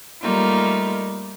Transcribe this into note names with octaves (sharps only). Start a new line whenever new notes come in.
G3 A3 A#3 D#4 F4